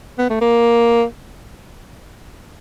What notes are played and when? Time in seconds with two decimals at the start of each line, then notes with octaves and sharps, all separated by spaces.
0.19 B3
0.30 A3
0.41 A#3